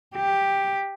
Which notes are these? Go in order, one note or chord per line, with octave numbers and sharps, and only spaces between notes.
G4